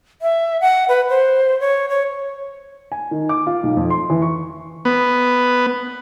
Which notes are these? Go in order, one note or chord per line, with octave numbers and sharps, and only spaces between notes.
E5
F#5
B4
C5
C#5
C#5
G#5
D#3
D6
F4
B1
F2
C6
E3
C#6
B3